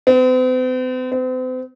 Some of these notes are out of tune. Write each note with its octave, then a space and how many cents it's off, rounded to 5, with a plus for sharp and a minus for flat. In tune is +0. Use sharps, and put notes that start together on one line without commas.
C4 -45
C4 -40